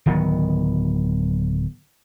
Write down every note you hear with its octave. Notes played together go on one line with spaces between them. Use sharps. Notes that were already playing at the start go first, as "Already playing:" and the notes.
D1 D#3 F#3 B3